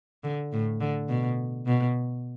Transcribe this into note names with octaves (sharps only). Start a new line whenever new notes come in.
D3
A2
D3
B2
B2